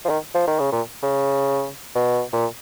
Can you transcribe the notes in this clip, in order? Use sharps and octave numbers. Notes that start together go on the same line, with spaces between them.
F3
D#3
F3
D#3
C#3
A#2
C#3
B2
A#2